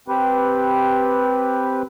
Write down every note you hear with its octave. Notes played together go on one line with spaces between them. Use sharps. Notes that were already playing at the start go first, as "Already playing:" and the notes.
C4 G4 B4